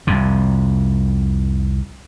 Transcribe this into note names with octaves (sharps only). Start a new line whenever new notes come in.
C2 F2 C3